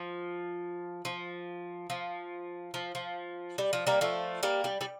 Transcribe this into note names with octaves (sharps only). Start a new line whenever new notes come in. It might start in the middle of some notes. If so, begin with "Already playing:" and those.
Already playing: F3
F3
F3
F3
F3
G3
F3
G3 A#3
F3 A3
G3 A#3
G3
G3